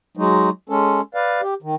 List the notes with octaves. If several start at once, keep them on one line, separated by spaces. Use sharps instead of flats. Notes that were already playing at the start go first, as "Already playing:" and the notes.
F#3 G#3 D#4
G#3 C#4 A4
B4 D5 F5
G4
D#3